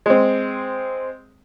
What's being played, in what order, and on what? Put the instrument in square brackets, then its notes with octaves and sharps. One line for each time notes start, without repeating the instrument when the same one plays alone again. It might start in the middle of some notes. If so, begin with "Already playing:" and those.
[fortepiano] G#3 C4